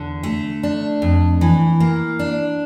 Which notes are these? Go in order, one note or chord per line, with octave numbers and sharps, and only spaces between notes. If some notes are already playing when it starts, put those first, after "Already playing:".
Already playing: E2 D3
A3
D4
F2
E3
A#3
D4